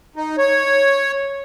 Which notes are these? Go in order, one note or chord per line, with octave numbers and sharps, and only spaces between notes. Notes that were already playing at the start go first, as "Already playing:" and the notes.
D#4
C#5